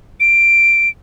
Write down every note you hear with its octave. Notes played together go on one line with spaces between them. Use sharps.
D7